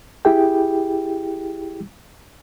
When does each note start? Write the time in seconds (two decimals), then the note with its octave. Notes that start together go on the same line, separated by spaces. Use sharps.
0.25 E4 G4 G#4 G5